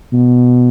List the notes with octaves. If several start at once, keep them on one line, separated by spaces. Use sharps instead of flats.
B2